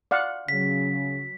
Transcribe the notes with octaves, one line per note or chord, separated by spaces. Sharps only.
D5 F5 F#5
C#3 F#3 B6